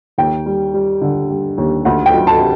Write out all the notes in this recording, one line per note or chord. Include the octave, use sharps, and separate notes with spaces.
D#2 G5
G3
G3
D3
G3
D#2
D2 F#5
G5
F#3
A5
C3